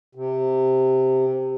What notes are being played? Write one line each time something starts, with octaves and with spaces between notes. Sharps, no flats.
C3